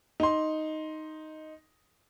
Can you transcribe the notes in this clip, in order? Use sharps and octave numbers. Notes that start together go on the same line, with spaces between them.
D#4 C6